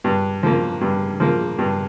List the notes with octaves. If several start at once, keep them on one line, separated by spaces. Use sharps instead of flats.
G2
F3 A#3
G2
F3 A#3
G2